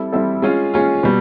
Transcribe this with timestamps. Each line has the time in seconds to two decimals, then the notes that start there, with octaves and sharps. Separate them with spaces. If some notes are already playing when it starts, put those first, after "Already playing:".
Already playing: G3 C4 E4 A4
0.13 G3 C4 E4 A4
0.42 G#3 C#4 F4
0.74 G#3 C#4 F4
1.03 B2 G3